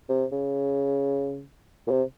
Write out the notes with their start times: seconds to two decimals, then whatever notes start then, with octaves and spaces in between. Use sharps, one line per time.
0.09 C3
0.32 C#3
1.87 A#2
1.91 C3